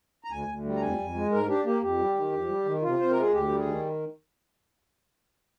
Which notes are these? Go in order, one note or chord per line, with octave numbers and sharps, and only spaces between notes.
A#5
D2 G#5
D2
G3
A#5
F2 G#5
F2
G#3
G#2 A#4
D4 G4
A#3 G4
F2 G4
G3
D#3
F2
G3
D#3
C3 F4
C3 C5
G#3 A#4
G#4
D2 G4
G3
G#4
D#3